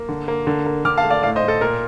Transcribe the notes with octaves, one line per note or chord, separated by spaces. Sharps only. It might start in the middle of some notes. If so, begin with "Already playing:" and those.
Already playing: A#3
D3
A#3
D3
A#3
D3 D6 F6
F5 A5
A3
D5 F5
A2 D5 F5
C5 D#5
A2
A4
A#2 A#4